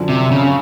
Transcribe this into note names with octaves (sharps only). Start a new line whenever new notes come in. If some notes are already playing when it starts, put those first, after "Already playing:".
Already playing: F#2 D3 F3
C3
C#3